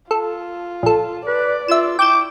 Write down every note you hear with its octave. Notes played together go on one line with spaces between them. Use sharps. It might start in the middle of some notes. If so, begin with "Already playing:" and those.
F4 A4
A#1 A4
B4 D5
F4 E5 E7
E4 G5 D6 G6 E7